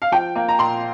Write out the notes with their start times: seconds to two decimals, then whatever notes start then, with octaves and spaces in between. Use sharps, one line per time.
0.02 F5
0.12 F3 G5
0.36 A#3
0.48 A#5
0.58 A#2 C6